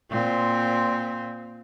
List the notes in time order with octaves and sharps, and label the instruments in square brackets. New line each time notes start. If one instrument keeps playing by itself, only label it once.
[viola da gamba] A#2 C4